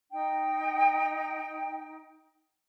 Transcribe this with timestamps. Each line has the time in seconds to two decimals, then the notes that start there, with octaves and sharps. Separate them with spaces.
0.12 D#4 G5